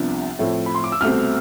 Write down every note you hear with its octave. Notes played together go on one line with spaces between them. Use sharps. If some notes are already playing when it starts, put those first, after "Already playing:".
Already playing: C2 C3 F3 B3 D4
A2 F3 A3 C4
B5
C6
D6
E6
C2 B2 A3 C4 F6